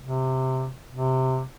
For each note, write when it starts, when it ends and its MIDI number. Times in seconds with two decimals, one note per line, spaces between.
0.01 0.70 48
0.92 1.43 48